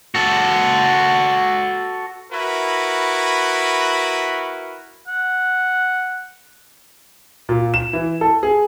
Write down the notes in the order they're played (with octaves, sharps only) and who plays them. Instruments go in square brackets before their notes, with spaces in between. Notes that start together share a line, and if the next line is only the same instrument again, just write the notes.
[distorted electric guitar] F#4 A4
[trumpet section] E4 F#4 A#4 B4
[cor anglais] F#5
[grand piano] A#2
E7
E3
A4
G#4